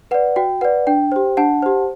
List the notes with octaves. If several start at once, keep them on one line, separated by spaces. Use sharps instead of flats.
B4 D5 F#5
F#4 G5
B4 D5 F#5
D4 G5
G4 C5
D4 F#5 A5
G4 C5